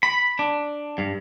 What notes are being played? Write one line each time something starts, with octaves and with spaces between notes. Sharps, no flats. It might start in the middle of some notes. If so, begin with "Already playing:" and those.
B5
D4
G2